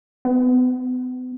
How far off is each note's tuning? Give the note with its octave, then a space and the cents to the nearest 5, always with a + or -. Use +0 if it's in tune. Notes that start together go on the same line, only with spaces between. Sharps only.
B3 +40